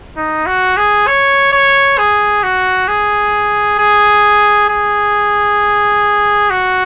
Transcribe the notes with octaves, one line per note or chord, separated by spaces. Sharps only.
D#4
F#4
G#4
C#5
C#5
G#4
F#4
G#4
G#4
G#4
F#4